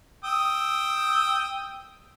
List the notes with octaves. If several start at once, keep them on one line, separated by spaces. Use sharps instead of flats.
G5 D#6 E6